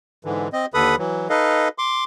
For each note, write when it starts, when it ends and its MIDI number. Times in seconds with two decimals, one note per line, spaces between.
0.25 0.48 44
0.25 0.48 50
0.25 0.48 52
0.53 0.66 60
0.53 0.66 75
0.74 0.96 39
0.74 0.96 50
0.74 0.96 69
0.74 0.96 71
0.74 0.96 83
0.74 0.96 87
0.98 1.28 52
0.98 1.28 54
1.30 1.68 63
1.30 1.68 69
1.30 1.68 71
1.30 1.68 75
1.30 1.68 77
1.78 2.04 84
1.78 2.04 86